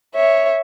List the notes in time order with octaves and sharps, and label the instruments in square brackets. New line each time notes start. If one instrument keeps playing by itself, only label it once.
[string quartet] C#5 E5